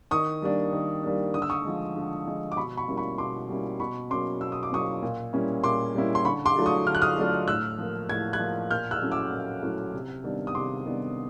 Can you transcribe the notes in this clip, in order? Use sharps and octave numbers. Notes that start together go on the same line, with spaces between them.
D#3 C#6 D#6
G3 A#3 D4
D#3
G3 A#3 D4
D3 D#6
E6
C#6 D#6
F3 G#3
D3
F3 G#3
D6
B2 B5 C#6
B5 C#6
G3 A#3 C#4 E4
B5 C#6
B2 C6 D6
G3 A#3 C#4 E4
B2 B5 C#6
F#3 A#3 C#4 C6 D6
B2 E6
D#6
D6
F#3 A#3 C#4 C#6 D#6
A#2
G3 A#3 C#4 E4
A#2 C6 D6
G3 A#3 C#4 E4
C6
D3 B5 C#6
C6 D6
F#3 A3 D4 F4
C#6 D#6
D3 F6
F#6
D#6 F6
F#3 A3 D4 F4
A2 E6 F#6
F3 A#3
A2 G#6
F#6 G#6
F3 A#3
A#2 F6 G6
E6 F#6
F#3 A3 C#4 E4
D6 E6
A#2
F#3 A3 C#4 E4
C3
D#3 G3 B3 D4
D#6
C3 C6 D6
D#3 G3 B3 D4